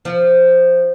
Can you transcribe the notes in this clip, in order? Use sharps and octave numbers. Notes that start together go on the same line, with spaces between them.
F3